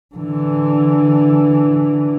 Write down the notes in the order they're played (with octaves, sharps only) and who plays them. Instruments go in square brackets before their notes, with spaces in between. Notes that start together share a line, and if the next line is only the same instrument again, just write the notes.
[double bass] D3 E3